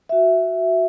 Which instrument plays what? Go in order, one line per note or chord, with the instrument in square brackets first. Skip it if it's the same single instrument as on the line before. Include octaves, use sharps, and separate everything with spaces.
[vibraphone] F#4 E5